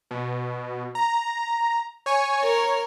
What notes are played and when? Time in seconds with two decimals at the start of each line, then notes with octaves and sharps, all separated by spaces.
0.11 B2
0.95 A#5
2.06 C#5 G#5 C#6
2.43 A#4 C#5